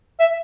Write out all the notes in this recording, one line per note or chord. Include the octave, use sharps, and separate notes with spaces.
E5